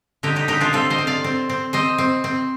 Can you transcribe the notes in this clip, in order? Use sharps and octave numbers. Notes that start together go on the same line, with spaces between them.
D3 D#4 G4
D#4 G4
D3 D#4 G4
D4 F4
C4 F4 A4
C5 D#5
C4
D5 F5
C4
C4
C4 C5 D#5
C4
C4